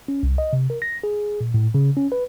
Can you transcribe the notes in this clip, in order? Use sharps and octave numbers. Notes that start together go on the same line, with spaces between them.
C#4
C2
D#5
C3
A#4
A#6
G#4
A#2
A2
C#3
C#4
B4